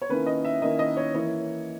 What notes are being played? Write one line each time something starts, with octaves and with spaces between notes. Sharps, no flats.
C#5
D#3 A#3 C#4 E4 B4
D#5
E5
D#3 A#3 C#4 E4 D#5
D#5
C#5
E3 A#3 E4 C#5